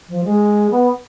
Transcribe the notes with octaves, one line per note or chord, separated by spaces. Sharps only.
F3
G#3
B3